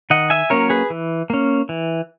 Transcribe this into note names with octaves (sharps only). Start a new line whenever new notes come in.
D#3 D#5 F#5
E5 G#5
F#3 A#3 C#4 A#4 C#5
G#4 B4
E3
A#3 C#4
E3